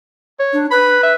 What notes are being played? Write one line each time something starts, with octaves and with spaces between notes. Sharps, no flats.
C#5
D4
B4 B5
E5